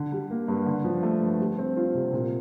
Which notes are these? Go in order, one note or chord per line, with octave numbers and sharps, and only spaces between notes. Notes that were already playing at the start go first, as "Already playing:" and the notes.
Already playing: D3
G3
A#3
G2
D3
F3
A3
G2
G3
C4
F4
C3
A#2